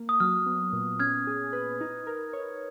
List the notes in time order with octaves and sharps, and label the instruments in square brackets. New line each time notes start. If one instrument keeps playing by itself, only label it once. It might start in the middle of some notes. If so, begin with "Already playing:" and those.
Already playing: [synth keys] A#3
[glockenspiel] D#6
[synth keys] F#3 [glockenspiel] F6
[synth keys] B3
A#2
[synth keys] C#4 [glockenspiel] F6 G#6
[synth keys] G#4
B4
D#4
A#4
C#5